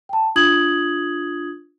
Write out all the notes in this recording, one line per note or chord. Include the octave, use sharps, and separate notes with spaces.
G5 A5
D4 F4 D#6 G#6 F#7